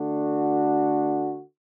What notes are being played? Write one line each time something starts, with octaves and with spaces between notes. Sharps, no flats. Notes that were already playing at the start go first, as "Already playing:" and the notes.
Already playing: D3 A3 D4 F#4